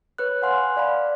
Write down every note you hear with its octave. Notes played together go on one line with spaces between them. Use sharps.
B4 C#5 F#6
F5 F#5 G#5 C6 F6 F#6
D5 F5 B5